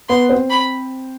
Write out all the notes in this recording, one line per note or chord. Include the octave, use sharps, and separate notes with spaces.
B3 B4 C6
C4 C5
B5